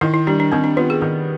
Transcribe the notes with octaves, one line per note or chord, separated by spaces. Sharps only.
D#3 E4
E4
G3 D4
D4
D#3 C4
D4
B3 F4
G#4
D#3